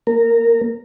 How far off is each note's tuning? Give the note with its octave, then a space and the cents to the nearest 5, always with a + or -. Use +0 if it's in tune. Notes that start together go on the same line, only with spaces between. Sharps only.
A#3 +0 A#4 -15